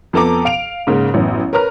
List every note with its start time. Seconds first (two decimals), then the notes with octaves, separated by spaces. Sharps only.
0.13 F2 B3 A4 A#5 D6
0.45 F5 D7 F7
0.87 G#2 C#3 A#3
1.14 A1 F#2 B3
1.53 A#4 B4 C#5 A#5 F6